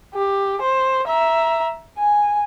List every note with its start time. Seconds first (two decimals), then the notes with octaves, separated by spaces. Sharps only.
0.14 G4
0.61 C5
1.07 E5 A#5
1.98 G#5